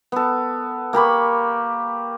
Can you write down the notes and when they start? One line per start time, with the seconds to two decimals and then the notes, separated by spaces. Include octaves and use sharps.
0.12 B3 A4
0.93 A#3 G4 B5 C#6